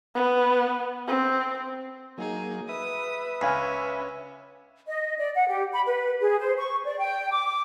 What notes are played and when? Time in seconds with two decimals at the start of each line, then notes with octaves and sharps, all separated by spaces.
0.15 B3
1.08 C4
2.18 F#3 A#3 D#4 G#4
2.69 B4 E5 D#6
3.41 C#2 C#4 F5 G#5 B5
4.87 D#5
5.18 D5
5.36 F#5
5.48 G4
5.72 B5
5.86 B4
6.22 G#4
6.40 C5
6.58 C#6
6.85 D5
6.99 G5
7.32 D6